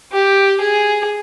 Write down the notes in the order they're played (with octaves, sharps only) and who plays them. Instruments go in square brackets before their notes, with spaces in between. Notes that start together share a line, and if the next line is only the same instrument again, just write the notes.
[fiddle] G4
G#4